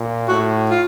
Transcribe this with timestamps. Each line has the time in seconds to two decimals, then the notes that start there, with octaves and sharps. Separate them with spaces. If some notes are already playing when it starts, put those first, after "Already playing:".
Already playing: A#2
0.28 A2 F#4
0.70 F4